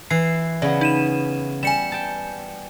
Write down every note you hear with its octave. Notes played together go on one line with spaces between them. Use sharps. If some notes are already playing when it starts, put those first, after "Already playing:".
E3 C7
C#3 B3 D5
D#4 D#7 E7
G3 G#5 C#7 E7
G5 A5